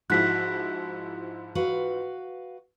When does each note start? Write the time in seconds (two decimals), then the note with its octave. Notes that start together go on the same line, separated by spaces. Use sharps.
0.10 G#2 F3 E4 F#4 F#6 B6
1.55 F#4 B4 F5